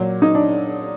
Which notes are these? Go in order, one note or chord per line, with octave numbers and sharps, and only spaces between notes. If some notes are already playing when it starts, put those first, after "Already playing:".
Already playing: A#2 F#3
D#4
D4